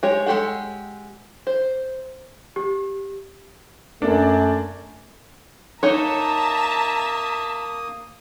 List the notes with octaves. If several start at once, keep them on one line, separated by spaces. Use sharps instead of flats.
G#3 G4 C#5
G#3 D#4 G4 A4 F#5
C5
G4
F#2 A3 A#3 D4
A#3 D#4 C#5 E5 A5 A#5 D#6